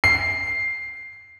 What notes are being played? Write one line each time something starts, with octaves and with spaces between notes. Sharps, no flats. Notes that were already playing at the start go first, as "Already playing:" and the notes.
C7